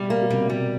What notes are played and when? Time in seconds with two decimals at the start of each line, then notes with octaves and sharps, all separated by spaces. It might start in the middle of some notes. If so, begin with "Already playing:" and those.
Already playing: B2 G3
0.10 A#3
0.22 B2
0.30 C3 G3
0.50 B2 G3